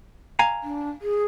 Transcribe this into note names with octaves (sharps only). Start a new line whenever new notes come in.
F5 G#5 A#5
D4
G#4